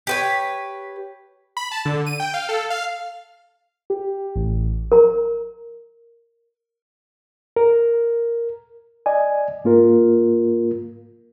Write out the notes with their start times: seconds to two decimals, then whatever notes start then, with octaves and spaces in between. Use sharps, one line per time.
0.07 G4 B4 C#5
1.57 B5
1.71 A5
1.85 D3
2.06 D#7
2.20 G5
2.34 F5
2.49 A4
2.70 F5
3.90 G4
4.36 A1
4.92 A#4 A#5
7.56 A#4
9.06 D5 D#5 G#5
9.64 G#2 A#3 F4 A#4